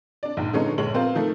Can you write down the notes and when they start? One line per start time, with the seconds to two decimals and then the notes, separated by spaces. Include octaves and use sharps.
0.23 D4 D5
0.37 A#1 G#2
0.53 D3 F3 G#3 B3 C#4 D#4
0.78 A#1 G#3 C#5 F#7
0.94 B3 C4 F4 A#4 C5
1.15 D#3 F3 A3